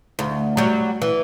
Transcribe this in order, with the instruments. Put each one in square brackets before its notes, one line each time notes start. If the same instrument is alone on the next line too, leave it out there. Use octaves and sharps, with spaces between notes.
[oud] D2
F#3 G3
E3